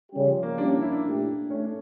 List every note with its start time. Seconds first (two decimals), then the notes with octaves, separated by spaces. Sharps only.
0.11 C#3 G3 C#4 G4
0.27 F3
0.43 A#3
0.58 G3 A#3 C#4 D4 E4
0.69 D4
0.81 E4
0.92 D4
1.04 A#2 A3 E4 G4
1.50 A3 C#4
1.65 D4